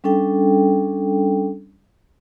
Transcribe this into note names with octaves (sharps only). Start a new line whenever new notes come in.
G3 C#4 D4 A4 G5